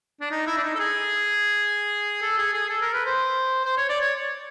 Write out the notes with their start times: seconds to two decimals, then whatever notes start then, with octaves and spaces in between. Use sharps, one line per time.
0.21 D4
0.31 D#4
0.47 E4
0.57 D4
0.63 D#4
0.75 A4
0.79 G#4
2.22 A4
2.38 G#4
2.53 G#4
2.69 A4
2.82 A#4
2.93 B4
3.06 C5
3.65 C5
3.77 C#5
3.89 D5
4.01 C#5